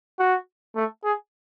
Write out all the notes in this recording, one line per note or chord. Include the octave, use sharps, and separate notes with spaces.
F#4
A3
G#4